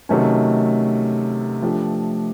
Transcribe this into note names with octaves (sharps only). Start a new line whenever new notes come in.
C3 D#3 F#3 A3 C#4
F3 A3 D4 G4